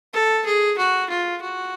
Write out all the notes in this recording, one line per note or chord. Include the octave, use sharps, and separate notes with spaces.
A4
G#4
F#4
F4
F#4